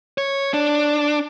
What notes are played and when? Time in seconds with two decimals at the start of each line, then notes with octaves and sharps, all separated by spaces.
0.18 C#5
0.54 D4